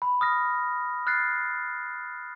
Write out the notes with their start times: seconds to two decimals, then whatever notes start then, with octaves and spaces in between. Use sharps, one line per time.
0.02 B5
0.21 D#6 F6 A#6
1.07 F6 F#6 G#6 A6 C7